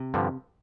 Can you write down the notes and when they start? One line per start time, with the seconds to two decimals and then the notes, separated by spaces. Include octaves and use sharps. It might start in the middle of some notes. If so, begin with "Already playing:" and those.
Already playing: C3
0.14 G2 D3 F3